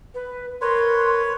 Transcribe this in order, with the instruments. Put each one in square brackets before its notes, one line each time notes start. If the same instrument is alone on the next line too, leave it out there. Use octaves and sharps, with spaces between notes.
[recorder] B4
[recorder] A#4 [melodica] B4 C#5 [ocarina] C6